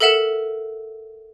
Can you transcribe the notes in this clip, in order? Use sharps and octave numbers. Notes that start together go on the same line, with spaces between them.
A4 A#4 E5 F#5 E7